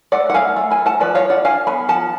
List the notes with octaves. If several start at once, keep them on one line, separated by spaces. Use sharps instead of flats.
A3 D5 F#5
F#5
A3 F5 G#5
A3
G#5 B5
A3
F#5 A5
F3 B4 D5
C#5 F5
F3
D5 F#5
D4 F5 G#5
B3 G#5 B5
F3 F#5 A5